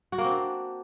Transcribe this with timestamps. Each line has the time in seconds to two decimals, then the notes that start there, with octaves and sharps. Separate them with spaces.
0.12 F#4
0.18 A#3
0.24 C4
0.30 D4